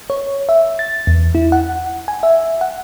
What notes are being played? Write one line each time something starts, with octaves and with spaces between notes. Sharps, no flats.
C#5
E5
A6
E2
E4
F#5
G#5
E5
F#5